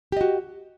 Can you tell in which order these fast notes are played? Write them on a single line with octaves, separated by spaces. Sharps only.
G4 D#5 F#4